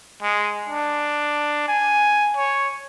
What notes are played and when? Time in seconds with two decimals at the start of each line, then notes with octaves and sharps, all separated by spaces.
0.23 G#3
0.69 D4
1.68 G#5
2.37 C#5